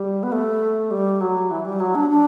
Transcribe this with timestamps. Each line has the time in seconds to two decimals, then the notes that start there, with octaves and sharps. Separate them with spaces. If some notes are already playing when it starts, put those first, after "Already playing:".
Already playing: G3
0.23 B3
0.32 A3
0.91 G3
1.21 F#3
1.51 E3
1.65 G3
1.80 F#3
1.95 D4
2.10 D4